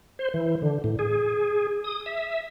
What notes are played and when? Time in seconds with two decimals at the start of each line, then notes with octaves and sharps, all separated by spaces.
0.19 C5
0.34 E3
0.62 D3
0.84 A2
0.99 G#4
1.84 D#6
2.06 E5